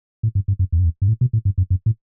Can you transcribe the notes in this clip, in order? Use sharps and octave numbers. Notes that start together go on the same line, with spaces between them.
A2
G2
G2
F#2
E2
F#2
E2
G2
A2
B2
A2
G2
F#2
F#2
A2